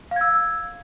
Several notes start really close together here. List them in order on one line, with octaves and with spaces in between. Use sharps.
F5 G#6 E6